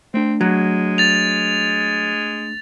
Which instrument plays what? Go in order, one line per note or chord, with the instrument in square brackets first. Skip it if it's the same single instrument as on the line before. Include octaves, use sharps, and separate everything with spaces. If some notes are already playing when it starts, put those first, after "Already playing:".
[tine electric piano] A3 D4 [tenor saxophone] C4
[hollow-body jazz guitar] F#3 [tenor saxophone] G#3
[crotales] A6 F7